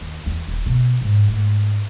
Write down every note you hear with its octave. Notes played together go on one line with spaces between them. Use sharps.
D#2
E2
D#1
B2
G#2
G#2 A3